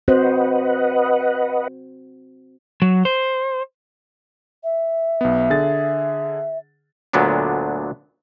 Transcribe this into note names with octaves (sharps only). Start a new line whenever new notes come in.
C4 F#4 B4 C5 D#5 F#5
F#3
C5
E5
B1 B3
D3 G#4 A6
D2 A#2 D3 F#3 B3 D4